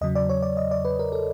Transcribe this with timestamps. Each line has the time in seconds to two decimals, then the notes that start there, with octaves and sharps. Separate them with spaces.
0.01 E2 C#3 F#3 D#5
0.15 D5
0.29 C#5
0.42 D5
0.57 D#5
0.71 D5
0.85 B4
0.99 A#4
1.12 A4